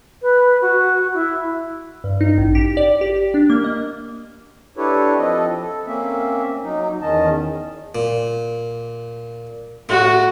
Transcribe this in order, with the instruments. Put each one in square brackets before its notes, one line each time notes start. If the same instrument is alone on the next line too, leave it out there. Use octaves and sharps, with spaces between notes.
[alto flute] B4
F#4
E4
[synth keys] G2
D#4
A1
G4
D5
G4
D4
A#3
D#5
[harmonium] D4 E4 G4 A4 B4 C#5
F3 C4 A4 D#5
A4
A#3 C4 C#4 E5
F#3 D#4
E2 D#3 C#4 D#5 A5
[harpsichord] A#2
[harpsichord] A2 [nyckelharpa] F#4